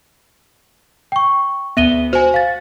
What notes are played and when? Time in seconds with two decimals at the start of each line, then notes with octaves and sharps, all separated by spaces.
1.12 G5 C#6
1.77 D2 B3 E5 D#7 G7
2.13 F#4 C5 G#5
2.34 F5 A6